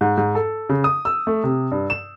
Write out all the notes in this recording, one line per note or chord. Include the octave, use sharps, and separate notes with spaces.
G#2
G#2
A4
C#3
D#6
E6
A3
C3
G2
E7